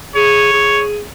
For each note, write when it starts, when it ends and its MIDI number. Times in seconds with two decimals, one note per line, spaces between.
0.16 0.49 68
0.16 0.83 73
0.53 1.02 68